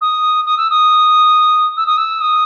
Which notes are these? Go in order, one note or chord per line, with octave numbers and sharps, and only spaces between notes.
D#6
D#6
E6
D#6
E6
D#6
E6
D#6